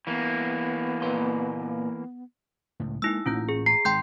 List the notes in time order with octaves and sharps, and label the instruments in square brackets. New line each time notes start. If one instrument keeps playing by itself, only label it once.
[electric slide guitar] E3 A#3 [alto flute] B3
[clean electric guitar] A#2 B4 C6
[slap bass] C#2 A2
[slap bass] G#3 A#3 [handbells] D#4 E4 E6
[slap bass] A1 A2 A#3 [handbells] C#4 F4 G6
[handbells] G#4
[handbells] A#5 [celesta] C7
[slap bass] G#1 G#2 G#3 [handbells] G5 C6 G6